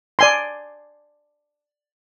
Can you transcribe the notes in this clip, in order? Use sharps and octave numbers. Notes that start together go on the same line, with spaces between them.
D5 G#5 C6